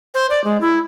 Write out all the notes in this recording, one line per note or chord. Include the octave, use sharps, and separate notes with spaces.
C5
D5
G#3
E4